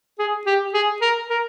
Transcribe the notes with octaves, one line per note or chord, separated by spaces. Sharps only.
G#4
G4
G#4
A#4
A#4